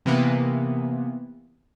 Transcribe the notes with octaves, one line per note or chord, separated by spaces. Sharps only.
C3 E3 A#3 B3